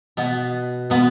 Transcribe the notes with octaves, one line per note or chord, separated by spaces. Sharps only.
B2 B3
B2 B3